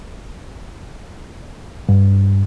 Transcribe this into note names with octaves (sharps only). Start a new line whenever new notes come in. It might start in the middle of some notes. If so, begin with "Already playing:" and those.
G2